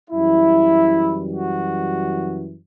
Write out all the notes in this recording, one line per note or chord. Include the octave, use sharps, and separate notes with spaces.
F#2 E3 G3 E4
F#4